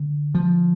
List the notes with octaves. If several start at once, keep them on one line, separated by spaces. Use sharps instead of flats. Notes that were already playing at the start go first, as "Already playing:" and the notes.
Already playing: D3
F3